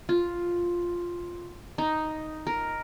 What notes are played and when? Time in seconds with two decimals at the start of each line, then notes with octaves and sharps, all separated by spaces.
0.09 F4
1.78 D#4
2.47 A#4